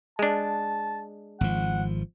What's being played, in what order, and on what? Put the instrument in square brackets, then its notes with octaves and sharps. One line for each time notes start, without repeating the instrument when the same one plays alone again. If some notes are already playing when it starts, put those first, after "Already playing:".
[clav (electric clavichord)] G#3 D4 [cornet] A5
[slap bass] G#1 F3 [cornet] F#5